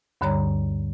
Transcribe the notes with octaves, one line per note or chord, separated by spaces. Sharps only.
D2 G2 D3 G3 C#5 A#5